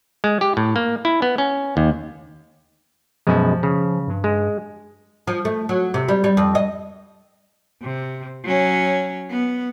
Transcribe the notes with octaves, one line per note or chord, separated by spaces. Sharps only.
G#3
G4
A2
A#3
E4
B3
C#4
D#2
F#2 B2 F3 G#3
C#3
G2
G#3
F3
A3
F#3
C3
G3
G3
F2
D#5
C3
F#3 C#4
B3